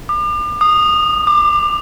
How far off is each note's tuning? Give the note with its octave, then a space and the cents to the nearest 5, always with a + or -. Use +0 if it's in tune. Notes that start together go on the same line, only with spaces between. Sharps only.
D6 +40
D#6 -20
D6 +25